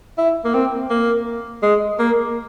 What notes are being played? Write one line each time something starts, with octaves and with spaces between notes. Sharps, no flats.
E4
A#3
C4
A#3
G#3
A#3